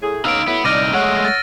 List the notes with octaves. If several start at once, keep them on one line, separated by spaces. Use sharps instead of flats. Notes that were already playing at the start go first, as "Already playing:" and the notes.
A2 G#4
C#3 B3 D#4 F5 E6 D7
F#3 A3 B3 E4
C2 D#4 D5 F6 A#6 D#7
G#3 A3 C#5 F#5
A6 A#6